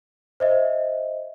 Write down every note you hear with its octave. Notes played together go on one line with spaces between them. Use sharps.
C5 D#5 E5